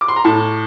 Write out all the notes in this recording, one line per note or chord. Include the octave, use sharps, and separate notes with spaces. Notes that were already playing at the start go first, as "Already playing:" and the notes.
D6
C6
A#5
A2 A5